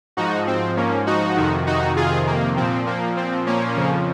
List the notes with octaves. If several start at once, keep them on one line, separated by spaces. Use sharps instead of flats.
G#2 F3 D#4 F#4
C4
A#3 C#4
D#4 F#4
F2 C3 D#3
D#4 F#4
F4 G#4
A#3
A#2 F3 C4
A#3
C4
A#3 C#4
F2 C#3 F3